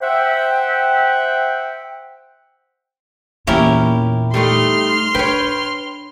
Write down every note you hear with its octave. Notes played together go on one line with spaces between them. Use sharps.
C5 E5 F#5 G5
E2 A#2 C#4 E4 G4 A#4
G3 A3 D#4 C6 F6
D4 B4 C#5 G5